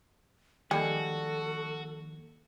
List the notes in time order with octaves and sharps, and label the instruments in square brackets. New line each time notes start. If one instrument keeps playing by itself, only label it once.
[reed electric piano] D#3 F3 A#3 [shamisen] G3 G#3 G#4 [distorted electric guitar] F#4 [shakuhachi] A4